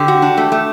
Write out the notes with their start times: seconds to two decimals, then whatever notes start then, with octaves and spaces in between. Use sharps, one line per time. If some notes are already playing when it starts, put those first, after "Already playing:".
Already playing: D3 G4
0.08 F#4
0.22 D4
0.38 A3
0.52 A3